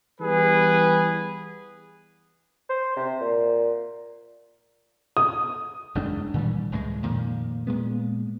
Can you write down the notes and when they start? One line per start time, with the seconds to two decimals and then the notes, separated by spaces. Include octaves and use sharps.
0.19 E3 G3 B3 G#4 B4
2.70 C5
2.97 C3
3.20 A#2
5.17 D#6
5.95 F#1 E2 G#3 D4
6.34 A#2 D#3 E3 G3
6.72 C#2 A2 G3 G#3
7.03 F2 A#2 D#3
7.67 A#2 G#3 B3